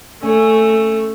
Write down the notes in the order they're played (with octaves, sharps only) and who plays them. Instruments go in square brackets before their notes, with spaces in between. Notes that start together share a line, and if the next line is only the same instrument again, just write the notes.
[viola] A3 [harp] C#4